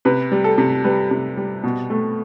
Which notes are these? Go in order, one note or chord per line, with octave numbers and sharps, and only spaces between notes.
C3 B4
G3
A4
C3
G3 B4
C3
G3
B2
A3